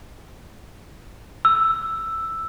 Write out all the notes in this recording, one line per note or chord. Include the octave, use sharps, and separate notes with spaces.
E6